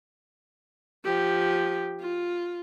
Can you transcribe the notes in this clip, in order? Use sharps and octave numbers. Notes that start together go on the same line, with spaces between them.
F3 G4
F4